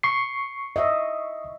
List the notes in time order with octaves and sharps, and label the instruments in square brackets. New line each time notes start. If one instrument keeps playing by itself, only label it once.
[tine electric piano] C#6 C7
[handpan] D#5 E5